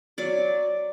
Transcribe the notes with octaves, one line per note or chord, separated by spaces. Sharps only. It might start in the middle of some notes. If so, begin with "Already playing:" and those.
F#3 D5